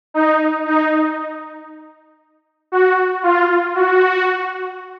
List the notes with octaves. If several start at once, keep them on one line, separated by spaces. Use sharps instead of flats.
D#4
D#4
F#4
F4
F#4